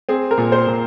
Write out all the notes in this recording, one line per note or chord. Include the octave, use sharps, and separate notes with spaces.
C4 G#4
A#4
A#2
C5
A#2